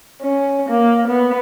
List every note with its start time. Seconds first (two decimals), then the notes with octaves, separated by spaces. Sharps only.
0.22 C#4
0.69 A#3
1.08 B3